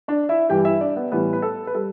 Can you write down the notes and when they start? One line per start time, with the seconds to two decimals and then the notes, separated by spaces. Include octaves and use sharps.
0.08 D4 D5
0.29 E4 E5
0.49 G2 E3 G3 G4 G5
0.65 E4 E5
0.81 D4 D5
0.96 B3 B4
1.12 A2 E3 G3 B3 B4
1.33 B4
1.42 A4
1.67 B4
1.74 G3 A4